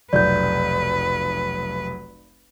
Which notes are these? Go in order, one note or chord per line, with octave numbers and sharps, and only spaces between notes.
F1 B1 B4 D5 G6